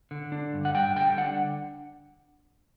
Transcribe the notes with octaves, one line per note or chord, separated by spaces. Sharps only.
D3
D4
G2
F#5
G3 G5
D3 G5
D4 F#5